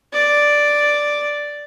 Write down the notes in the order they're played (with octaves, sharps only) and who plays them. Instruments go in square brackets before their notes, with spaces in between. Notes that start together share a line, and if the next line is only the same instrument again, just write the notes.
[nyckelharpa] D5